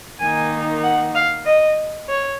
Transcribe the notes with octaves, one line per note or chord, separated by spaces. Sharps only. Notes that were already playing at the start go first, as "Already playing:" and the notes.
D#3 A#3 D#4 G#5
F#5
F5
D#5
C#5